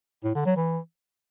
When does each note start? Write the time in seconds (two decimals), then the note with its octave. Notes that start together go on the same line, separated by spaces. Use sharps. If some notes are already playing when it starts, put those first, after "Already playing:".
0.24 A2
0.35 D3
0.46 F#3
0.57 E3